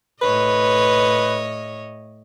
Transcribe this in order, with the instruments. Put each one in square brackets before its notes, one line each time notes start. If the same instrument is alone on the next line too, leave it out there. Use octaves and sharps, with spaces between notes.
[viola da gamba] A2 C#5 D#5 [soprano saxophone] B4